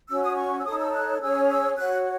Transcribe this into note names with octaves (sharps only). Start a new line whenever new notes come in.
C#4 F#4 C#5 E6
D#6
C#6
E6
D#4 A4 C#5 D#6
E6
F#6
C#4 G#4 C#5 E6
E6
F#4 C#5 F#6